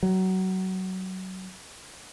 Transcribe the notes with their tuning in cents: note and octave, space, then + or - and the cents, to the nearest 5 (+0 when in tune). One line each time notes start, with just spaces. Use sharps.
F#3 +20